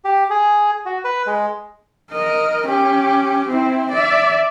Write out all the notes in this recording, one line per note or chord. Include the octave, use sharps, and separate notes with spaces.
G4
G#4
F#4
B4
G#3
A#4 D#5
C#4 G4
C4 E4
D5 E5